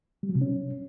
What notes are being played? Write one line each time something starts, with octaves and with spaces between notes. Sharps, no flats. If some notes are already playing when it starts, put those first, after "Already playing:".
G3
F#3
C3
C#4